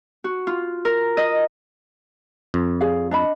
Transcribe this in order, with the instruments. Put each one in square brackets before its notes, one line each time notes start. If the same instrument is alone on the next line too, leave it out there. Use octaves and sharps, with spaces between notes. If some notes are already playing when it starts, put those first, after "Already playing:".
[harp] F#4
F4
A#4
D#5
[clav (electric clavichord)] F2
[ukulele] G#4 D5 F5
D4 D#5 B5